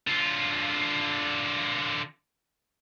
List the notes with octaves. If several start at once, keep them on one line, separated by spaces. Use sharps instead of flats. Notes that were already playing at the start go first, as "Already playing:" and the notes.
D3 F4